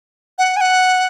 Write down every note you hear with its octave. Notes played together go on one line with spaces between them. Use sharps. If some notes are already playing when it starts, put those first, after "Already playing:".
F#5
G#5
F#5